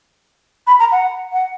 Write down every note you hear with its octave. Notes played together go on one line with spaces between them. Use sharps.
B5
A#5
F#5
F#5